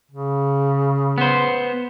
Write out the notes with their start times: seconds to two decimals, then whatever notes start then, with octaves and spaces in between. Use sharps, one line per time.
0.11 C#3
1.18 B3 C5